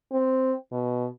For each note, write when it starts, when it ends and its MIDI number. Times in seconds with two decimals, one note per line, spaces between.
0.12 0.54 60
0.72 1.07 47